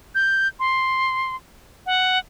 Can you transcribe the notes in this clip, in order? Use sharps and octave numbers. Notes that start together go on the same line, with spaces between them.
G6
C6
F#5